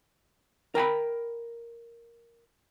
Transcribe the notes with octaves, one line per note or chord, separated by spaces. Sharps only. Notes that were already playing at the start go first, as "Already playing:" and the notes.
A#4 G5 G#5 B5